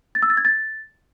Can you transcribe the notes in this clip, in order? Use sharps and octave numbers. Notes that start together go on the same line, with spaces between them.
A6
E6
A6
G#6
A6